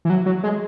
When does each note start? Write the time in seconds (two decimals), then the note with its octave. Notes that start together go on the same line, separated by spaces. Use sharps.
0.05 E3
0.10 F#3
0.26 F#3
0.43 G#3